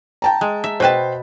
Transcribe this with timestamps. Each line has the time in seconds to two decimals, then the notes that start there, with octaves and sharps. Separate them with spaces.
0.22 G5 A5 A#5
0.41 G#3
0.64 E5
0.80 B2 B4 C5 G5 A5